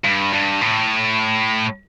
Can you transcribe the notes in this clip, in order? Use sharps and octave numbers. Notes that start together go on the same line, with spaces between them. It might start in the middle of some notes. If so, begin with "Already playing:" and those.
G2
G2
A2